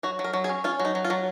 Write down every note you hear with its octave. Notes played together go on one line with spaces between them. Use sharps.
F#3 F#4
F#3
A#4
F#3
G#4
C#4
C#4 F4
F#3
D#4
F#3
F4
F#3